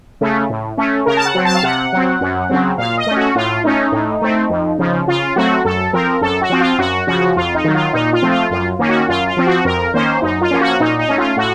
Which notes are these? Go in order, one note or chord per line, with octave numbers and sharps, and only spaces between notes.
C#3 A3 C#4
A2
A3 C#4
C#3 A#4
A5
F#5
F#3 C4
A5
F5
C3 F#5
F#3 C4
F#2
C#3 F#3 C4
A#2 F5
D#5
A3 C#4
F#4
A2 F4
A3 C#4 D#4
A2
A3 C4
F2
C#3 F3
C#3 F4
F#3 A3 C4 F#4
F#2 A4
F3 C4 A#4
F#2 A4
F#4
F3 C4
F4
F#2 F#4
C#3 F3 F#4
F2 F4
D#4
D#3 F#3
F4
A#2 D#4
F4
F3 A3 C4
F4
F#2 F4
D#3 A#3 C#4
F#4
F#2 F4
F4
F3 C4
F#4
F2 A#4
D#3 A#3 C#4 C5
F#2 D#4
F4
F3 A#3 C#4
F#4
A#2 D#4
D#4
A3 C#4
F4
A2 F#4